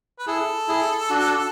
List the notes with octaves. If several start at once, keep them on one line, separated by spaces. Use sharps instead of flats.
B4
E4 G#4 A4
E4 G#4
D4 F#4